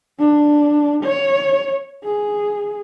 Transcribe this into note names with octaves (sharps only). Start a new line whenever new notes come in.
D4
C#5
G#4